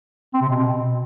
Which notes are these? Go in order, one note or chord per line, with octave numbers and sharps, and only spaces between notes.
C4
C3
B2